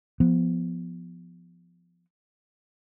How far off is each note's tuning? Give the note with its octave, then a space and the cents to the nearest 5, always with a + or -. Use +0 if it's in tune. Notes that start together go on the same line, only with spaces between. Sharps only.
F3 -5 B3 +0